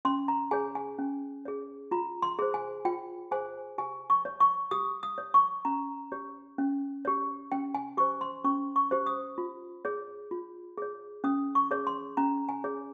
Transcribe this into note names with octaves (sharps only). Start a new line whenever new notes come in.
C#4 C6
A#5
G#4 C#5 G#5
G#5
C#4
G#4 C#5
F4 A#5
C6
G#4 C5
G#5
F4 G5
G#4 C5 G#5
G4 G#5
C#6
C#5
C#6
G4 D#6
D#6
C#5
C#6
C#4 A#5
G4 C#5
C#4
G4 C#5
C#4 G5
G#5
G4 C5 C#6
C6
C#4 C#6
C#6
G4 C5
D#6
F4
G#4 C#5
F4
G#4 C#5
C#4 D#6
C#6
G#4 C#5
C6
C#4 A#5
G#5
G#4 C#5